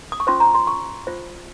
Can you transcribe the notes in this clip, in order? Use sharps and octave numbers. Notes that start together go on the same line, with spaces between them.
D#6
C#6
C#4 F4 C5 C6
A#5
C6
C#6
F4 C5